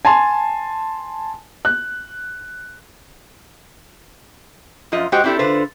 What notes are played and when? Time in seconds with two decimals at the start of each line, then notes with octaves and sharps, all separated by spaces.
0.05 G#5 A5 C6
1.65 F#6
4.92 F#2 F3 F4 D#5
5.12 G#3 F#4 G4 C5 D#5 G5
5.24 C4 D4 E4 G4 A4
5.39 D3 F4 A4 B4 C5